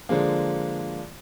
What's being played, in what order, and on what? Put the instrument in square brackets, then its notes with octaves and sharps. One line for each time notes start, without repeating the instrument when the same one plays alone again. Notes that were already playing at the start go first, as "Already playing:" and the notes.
[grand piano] D3 F3 G#3 A#3